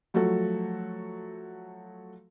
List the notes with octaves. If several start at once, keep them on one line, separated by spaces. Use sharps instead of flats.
F3 F#3 A3 F#4 A4